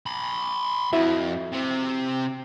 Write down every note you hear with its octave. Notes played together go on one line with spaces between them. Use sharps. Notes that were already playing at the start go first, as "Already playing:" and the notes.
B5 C6
F2 E4 F#4 E5
C3 C4